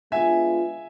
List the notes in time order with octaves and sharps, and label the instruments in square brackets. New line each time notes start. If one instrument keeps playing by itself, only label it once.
[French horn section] G#3 B3 D4 F4 [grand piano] E5 G#5